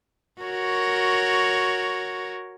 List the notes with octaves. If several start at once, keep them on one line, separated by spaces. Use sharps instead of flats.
F#4 A#4 C#5